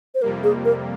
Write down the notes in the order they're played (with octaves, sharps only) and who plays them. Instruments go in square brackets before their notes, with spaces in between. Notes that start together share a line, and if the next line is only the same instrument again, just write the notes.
[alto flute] C5
[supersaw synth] F2 C3 G3 A#3 [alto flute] A#4
[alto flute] G#4
A#4